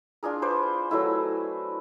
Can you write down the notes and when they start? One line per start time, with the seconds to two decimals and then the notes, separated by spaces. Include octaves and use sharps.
0.23 D4 F4 G#4 A#4
0.42 B4 C5 D5 D6
0.90 F#3 A3 E4 G#5